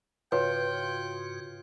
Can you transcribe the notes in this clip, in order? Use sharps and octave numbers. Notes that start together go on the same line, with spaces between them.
G#2 C#3 F4 F#4 B4 C#5 G5